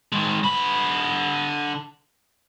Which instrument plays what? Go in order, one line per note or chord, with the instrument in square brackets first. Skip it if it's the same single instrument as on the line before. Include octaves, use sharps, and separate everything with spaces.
[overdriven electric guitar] D#3 G#3
D3 B5